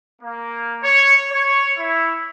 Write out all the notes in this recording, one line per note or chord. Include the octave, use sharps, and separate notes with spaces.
A#3
C#5
C#5
E4